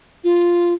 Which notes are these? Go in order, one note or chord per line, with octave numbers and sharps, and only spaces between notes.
F4